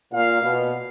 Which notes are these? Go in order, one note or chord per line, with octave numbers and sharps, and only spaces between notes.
A#2 F5
B2